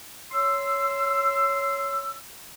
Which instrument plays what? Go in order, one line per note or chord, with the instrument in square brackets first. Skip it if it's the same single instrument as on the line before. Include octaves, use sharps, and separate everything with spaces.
[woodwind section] C#5 C6 E6